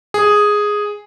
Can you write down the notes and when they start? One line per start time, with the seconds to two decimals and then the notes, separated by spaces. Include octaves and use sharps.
0.14 G#4